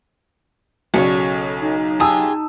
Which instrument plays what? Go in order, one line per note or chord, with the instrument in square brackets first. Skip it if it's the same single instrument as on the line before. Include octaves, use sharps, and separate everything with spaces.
[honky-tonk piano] B1 C#3 [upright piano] F#4 [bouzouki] A4 B4 C#5
[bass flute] D#4
[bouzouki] F4 G4 G#4 [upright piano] A5 D#6 E6